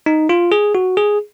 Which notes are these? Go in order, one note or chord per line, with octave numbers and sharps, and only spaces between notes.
D#4
F4
G#4
F#4
G#4